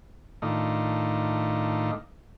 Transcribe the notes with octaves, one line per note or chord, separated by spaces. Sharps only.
A2 D#3 D4 D#4 F4